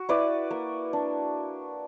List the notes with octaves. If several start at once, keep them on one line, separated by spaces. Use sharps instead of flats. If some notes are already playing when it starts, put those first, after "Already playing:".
Already playing: F#4
E4 B4 D5
A#3
D4